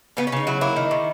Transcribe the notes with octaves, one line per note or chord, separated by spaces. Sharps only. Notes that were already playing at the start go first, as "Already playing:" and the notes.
C#3 B3
C#4
C#3 D#4
F#3 E4
A#3 E4
D#3
D#3